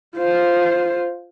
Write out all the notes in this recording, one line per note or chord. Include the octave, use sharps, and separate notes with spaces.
F4 C5